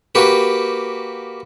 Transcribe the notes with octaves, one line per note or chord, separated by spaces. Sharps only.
A#3 F#4 G4 B4